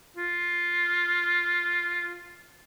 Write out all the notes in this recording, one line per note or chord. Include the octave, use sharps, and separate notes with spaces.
F4